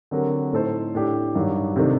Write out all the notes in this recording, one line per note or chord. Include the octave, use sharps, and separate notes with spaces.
D3 F#3 C4 G4 A#4
A2 A3 D#4 A4 C5
A2 A3 D4 G4
G2 D#3 F#3
C3 D#3 A3 D4